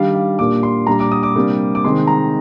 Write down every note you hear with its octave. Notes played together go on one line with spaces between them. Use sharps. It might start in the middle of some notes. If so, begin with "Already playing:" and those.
Already playing: D#3 G3 D4 F5
F5
A#2 G3 A#3 D4 D6
C6
A#2 G3 D4 A#5
D6
D#6
D6
C3 G3 A#3 D4
D6
C3 D#3 G#3 C4 C6
A#5